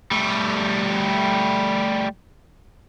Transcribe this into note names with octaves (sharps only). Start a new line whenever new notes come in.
G3 A3